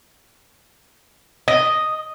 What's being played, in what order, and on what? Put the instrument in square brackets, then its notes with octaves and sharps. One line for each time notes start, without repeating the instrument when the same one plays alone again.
[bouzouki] D#5